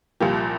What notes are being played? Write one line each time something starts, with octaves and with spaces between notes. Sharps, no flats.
C2 A#2 F3 A#3 G4